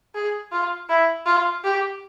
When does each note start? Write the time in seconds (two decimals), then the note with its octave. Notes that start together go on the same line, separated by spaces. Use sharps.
0.14 G#4
0.52 F4
0.89 E4
1.26 F4
1.64 G4